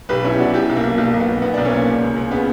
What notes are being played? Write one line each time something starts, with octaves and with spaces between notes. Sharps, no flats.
B1 G4 B4
B2 C#4 E4
G4
B2 D4 F#4
B2 E4 G4
B1
A#3
B1
B1 A#3
B1
B3
B1
B1 B3
B1 D4
A#3 C#4
A#2
C#2
C#2
C#2
C#3 B3